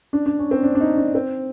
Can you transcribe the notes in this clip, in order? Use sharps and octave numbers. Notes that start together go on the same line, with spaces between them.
D4
D4
C#4
C4
D4
D4
D#4
D4
C4